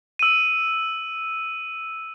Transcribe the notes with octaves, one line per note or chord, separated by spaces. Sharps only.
E6 D#7